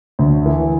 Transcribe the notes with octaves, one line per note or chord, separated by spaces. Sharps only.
D2
E3